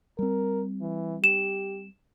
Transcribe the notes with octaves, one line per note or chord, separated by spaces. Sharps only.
G3 C4 A#4
E3
G4 E7